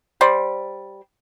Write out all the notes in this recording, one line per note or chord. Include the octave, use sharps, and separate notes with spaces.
G3 C5 D5